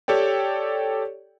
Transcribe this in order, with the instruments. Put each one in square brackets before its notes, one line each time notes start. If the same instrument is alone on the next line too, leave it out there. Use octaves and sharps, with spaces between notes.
[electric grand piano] G4 A4 C#5 D5 G5